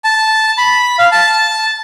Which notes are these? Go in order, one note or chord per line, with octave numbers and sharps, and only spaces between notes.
A5
B5
F5
A5